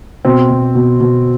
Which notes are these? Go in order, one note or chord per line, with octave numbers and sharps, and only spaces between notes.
B2 C4
B2
B2
B2